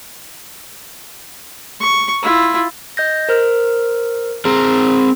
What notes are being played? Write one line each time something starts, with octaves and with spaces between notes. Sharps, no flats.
C#6
E4 F4
D#5 G6 A#6
A#4 C5 F6
C4 G#4 A#4